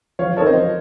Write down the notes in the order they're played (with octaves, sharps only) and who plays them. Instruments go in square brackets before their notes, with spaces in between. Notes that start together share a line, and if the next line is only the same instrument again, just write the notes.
[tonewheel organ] F3 [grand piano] C#5 F5
[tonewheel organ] C4 D#4 A4 [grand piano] A#4 C#5
[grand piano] C5 D#5
[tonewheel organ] F3